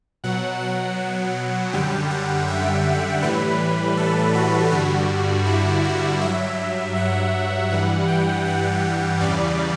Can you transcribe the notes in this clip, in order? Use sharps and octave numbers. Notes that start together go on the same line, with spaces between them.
B2 F#3 F#5
F#5
F#2 D3 G3 G5
F#5
E5
A2 E3 G3 B4
A4
F#4
G2 D3 G3 F#4
E4
F#4
G2 F#3 E5
F#5
G2 E3 G3 F#5
G5
F#5
E2 C#3 E3 G3 D5